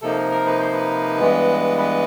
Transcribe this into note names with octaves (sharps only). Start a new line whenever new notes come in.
C3 F3 A#3 D#4 A4
A#4
B4
C5
B4
G2 E3 G#3 B3
B4